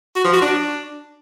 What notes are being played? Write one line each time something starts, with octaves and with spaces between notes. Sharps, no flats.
F#4
F3
F#4
D4